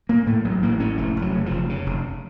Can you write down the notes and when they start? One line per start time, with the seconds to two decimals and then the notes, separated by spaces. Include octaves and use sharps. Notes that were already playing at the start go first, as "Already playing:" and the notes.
0.09 A2 A#3
0.26 A2 A3
0.44 A1 F#3
0.62 A1 A#3
0.80 A2 C#4
0.98 F1 A3
1.16 F1
1.22 F#3
1.34 C#3
1.46 F3
1.51 F1
1.69 C#3
1.86 F1